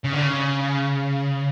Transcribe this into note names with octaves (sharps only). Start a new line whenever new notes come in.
C#3
D3
C#3